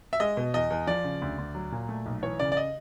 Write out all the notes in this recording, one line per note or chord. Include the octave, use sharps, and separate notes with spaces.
E5
G#3 D#5
B2
E2 D#5
E2
F3 D5
C#3
D2
D2
F#3
A#2
A3
B1
E3 C#5
C#3 D5
D5
D#5